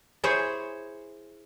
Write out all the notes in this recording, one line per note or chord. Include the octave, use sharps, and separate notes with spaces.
E4 G#4 C5 C#5